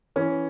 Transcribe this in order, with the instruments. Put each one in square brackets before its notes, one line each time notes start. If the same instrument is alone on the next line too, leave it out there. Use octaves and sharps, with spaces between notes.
[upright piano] E3 C#4